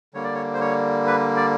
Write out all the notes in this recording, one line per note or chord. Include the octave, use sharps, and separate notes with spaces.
D3 G3 A#3 C#5
D5
C#5
C5
C#5
B4
D5